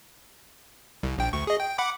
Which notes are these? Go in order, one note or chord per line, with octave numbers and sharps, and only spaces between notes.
C2
A#1 G5
D2 C#6
G#4 D#5
G5
F#5 B5 D6